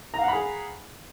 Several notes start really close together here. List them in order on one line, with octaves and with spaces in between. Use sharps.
A#5 F5 F#5 B5 G#4